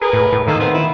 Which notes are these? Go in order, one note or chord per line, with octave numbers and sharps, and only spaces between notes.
G#4 A#4 B4
A2
A2
D#3 A#3 D#4 A4
B3 C4
E4